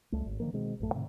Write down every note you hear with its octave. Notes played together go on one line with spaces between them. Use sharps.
C#2 G3 A3
G#1
D3 D#3 F3 A#3
B2 D#3 G#3 C4
A1 F#2 A3
A2 C3 D#3